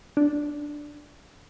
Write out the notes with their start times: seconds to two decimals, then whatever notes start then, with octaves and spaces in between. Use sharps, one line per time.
0.17 D4